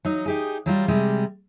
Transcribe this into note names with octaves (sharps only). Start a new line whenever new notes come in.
F#3 D#4
D#4 G4 G#4
F#3 G3 F4
C3 G3 G#3